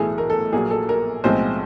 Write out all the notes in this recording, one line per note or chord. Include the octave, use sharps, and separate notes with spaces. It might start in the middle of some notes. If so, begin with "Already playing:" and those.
Already playing: B1 A2 E3 G#4 A4
A#4
A4
A#1 A#2 F#3 A#3 G#4
A4
A#4
B1 A2 F3 G#3 C4 C5